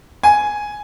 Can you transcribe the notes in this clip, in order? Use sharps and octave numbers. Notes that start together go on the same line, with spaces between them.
G#5